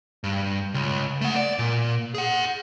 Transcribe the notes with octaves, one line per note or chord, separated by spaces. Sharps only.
G2
C#2
A3 F#5
D5
A#2
G#4 F#5